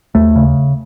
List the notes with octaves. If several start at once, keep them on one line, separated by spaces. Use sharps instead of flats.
D#2 A3
C#3